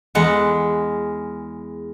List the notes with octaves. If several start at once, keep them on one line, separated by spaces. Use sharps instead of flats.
E2 G#3 F#5